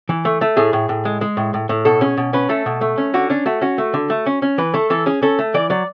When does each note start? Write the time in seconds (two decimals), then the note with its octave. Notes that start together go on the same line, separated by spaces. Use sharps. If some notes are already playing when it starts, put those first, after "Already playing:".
0.09 E3
0.25 A3
0.41 A3
0.57 A2 G#4
0.73 A2
0.89 A2
1.05 G#3
1.21 G#3
1.37 A2
1.54 A2
1.69 A2
1.85 B2 A4
2.01 C#4 G#4
2.17 B2
2.33 C#4 B4
2.49 A3 A4
2.66 B2
2.81 A3
2.98 C#4
3.14 D3 F#4
3.30 C#4 D4
3.46 A3 F#4
3.61 C#4 F#4
3.78 A3
3.94 D3
4.10 A3
4.26 C#4
4.42 C#4
4.58 E3 B4
4.74 A3 A4
4.90 E3 A4
5.06 C#4 G#4
5.23 C#4 A4
5.39 A3
5.54 E3 D5
5.70 F#3 D5